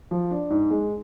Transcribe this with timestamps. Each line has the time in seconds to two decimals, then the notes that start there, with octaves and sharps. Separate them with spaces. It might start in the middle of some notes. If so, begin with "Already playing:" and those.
0.11 F3
0.31 D4
0.50 G#2
0.70 G#3